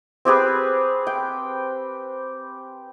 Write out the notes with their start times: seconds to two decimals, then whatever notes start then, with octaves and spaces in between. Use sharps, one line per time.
0.25 C4 G4 G#4 B4
1.07 G5